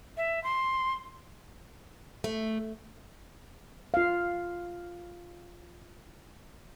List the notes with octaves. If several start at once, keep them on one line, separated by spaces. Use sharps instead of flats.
E5
C6
A3
F4 F5